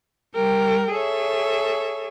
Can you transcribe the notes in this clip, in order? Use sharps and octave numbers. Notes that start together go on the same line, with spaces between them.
G3 A#4 G5
G#4 A4 C#5 E5